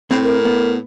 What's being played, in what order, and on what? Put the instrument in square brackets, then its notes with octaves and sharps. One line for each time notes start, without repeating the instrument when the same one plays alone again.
[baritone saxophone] A2 [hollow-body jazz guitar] C4
[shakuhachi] A#4
[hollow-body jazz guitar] B3